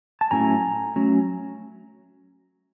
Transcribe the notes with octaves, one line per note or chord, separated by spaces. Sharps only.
A5
A2 F#3 A3 C#4 E4 G#5 A#5
F#3 A3 C#4